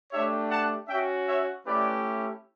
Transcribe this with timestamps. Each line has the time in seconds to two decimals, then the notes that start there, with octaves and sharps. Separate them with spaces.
0.12 A3 D4 G4 C#5 E5
0.50 F#5 A5
0.88 C#4 F#4 E5 G5
1.26 C#5 E5
1.65 A3 C#4 E4 G4 B4 D5